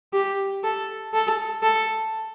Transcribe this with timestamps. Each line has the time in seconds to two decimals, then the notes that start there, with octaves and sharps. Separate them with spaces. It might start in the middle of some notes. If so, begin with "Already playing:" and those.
0.13 G4
0.64 A4
1.14 A4
1.63 A4